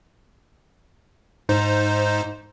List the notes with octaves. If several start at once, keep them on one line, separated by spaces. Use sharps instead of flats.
G#2 D#4 C5